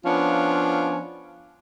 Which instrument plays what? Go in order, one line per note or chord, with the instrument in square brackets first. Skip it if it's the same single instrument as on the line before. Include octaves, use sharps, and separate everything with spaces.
[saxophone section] F3 B3 C#4 D4 F4